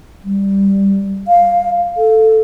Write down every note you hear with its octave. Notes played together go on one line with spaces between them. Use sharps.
G3
F5
A4